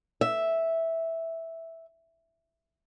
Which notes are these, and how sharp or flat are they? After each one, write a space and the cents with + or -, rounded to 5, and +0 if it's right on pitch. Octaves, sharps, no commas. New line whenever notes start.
E5 -5